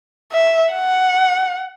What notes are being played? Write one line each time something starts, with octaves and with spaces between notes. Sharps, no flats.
E5
F#5